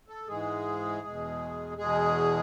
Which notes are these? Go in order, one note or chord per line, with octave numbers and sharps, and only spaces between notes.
A4
G#2 E3 G#3 G#4
E2 B2 G#3
E2 B2 G#3 G#4